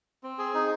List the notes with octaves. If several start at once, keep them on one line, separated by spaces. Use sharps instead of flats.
C4
G#4
D#4